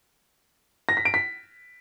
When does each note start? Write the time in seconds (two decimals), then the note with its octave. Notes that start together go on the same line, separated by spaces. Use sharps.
0.89 A#6
0.97 B6
1.05 D7
1.14 B6